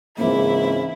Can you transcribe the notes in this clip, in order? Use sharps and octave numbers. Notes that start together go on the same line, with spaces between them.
C#2 G#2 C#3 E3 A#3 C4 E4